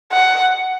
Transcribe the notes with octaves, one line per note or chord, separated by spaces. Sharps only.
F#5